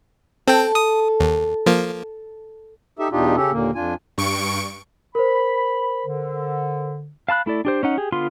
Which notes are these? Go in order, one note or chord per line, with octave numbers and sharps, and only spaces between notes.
C4 A4 G5
D#6
D#2
F3 A#3
D#4 G4 A4 E5
E2 B2 D4 D#4 F4 G4
C#3 C#4 G4 A4
D#2 A#2 D3 A#3
F2 D4 F4 G#5
G2 C#6 D7
A#4 C5 B5
D3
F5 A5 B5 F#6
A3 E4 A4 D5
D4 G4 C5
C#4 D#4 F#5
G4 G#4
D3 B3 F4 C6